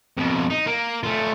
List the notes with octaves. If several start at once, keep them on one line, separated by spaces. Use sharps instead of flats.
F2 B2
D#4
A#3
A3 F4